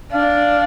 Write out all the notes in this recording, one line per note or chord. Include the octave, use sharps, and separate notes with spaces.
D4 F5